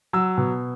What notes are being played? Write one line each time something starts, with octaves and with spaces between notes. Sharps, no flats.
F#3 E6
B2